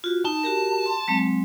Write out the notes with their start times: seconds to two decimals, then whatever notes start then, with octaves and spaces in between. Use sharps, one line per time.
0.04 F4 F#4
0.25 D#4 A5
0.43 F#4 G4 A#4
0.86 C6
1.08 F#3 G#3 C4